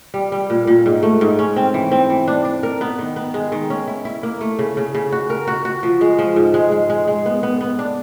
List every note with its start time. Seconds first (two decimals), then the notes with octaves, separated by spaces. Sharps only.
0.14 G3
0.32 G3
0.50 A#2
0.67 A#2
0.86 G#2
1.03 A3
1.21 G#2
1.39 C#4
1.56 C4
1.74 E3
1.91 C4
2.10 E3
2.28 D4
2.45 D4
2.63 A#4
2.81 B3
2.99 D#3
3.16 B3
3.34 G#3
3.52 D#3
3.70 C#4
3.88 E4
4.05 E4
4.23 A#3
4.41 A3
4.59 C#3
4.77 C#3
4.95 C#3
5.12 F#4
5.30 A#4
5.47 F#4
5.65 F#4
5.83 F3
6.01 G#3
6.19 F3
6.36 G#2
6.54 G#3
6.72 G#3
6.90 G#3
7.08 G#3
7.26 B3
7.43 B3
7.61 B3
7.79 D4